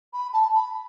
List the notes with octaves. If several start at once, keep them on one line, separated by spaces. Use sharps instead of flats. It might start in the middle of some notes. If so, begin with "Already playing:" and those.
B5
A5
B5